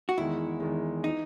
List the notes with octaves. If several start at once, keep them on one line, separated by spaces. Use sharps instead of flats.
F#4
E2 D#3 G#3 E4
E2 D#3 G#3
E3 D#4